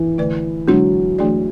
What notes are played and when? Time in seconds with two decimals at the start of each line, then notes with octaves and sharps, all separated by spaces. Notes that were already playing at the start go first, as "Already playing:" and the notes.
Already playing: E3
0.18 D3 A3 E4 B4 D5
0.68 D3 F#3 G#3 D4 F#4 C#5
1.19 E3 A3 D4 G#4 D5